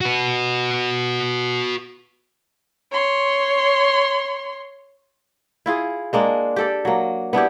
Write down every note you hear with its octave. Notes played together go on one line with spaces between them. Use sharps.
F#4 B4
C#5 C6
E4 F4 G#4
G#3 A#3 D4
G4 A4 D5
F#3 A#3
B3 D4 E4 G4